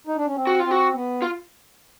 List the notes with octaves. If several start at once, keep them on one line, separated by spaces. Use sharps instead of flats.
D#4
D4
C#4
C4
F#4
F4
C4
F#4
B3
F4